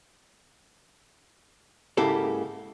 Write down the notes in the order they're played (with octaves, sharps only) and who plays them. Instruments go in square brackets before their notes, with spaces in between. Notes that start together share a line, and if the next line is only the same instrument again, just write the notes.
[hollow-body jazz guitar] G#2 C#3 A#3 E4 G4 A4